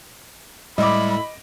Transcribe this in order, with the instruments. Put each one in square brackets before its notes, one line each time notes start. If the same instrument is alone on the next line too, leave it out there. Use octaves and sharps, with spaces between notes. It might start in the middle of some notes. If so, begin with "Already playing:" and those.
[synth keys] A2 E4 [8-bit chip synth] G3 G#3 [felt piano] D#5 D6 [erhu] B5